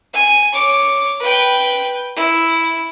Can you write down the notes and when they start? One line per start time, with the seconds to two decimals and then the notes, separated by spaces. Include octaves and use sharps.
0.13 G#5
0.53 C#5 D6
1.20 B4 G5
2.16 E4